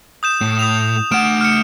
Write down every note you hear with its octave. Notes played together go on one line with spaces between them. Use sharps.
D#6 G6 E7
A2
D#6 E7 F7
A3 F#5 F6 D7 E7
F6 C#7